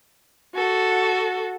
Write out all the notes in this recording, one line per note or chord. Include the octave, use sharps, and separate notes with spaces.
F#4 A4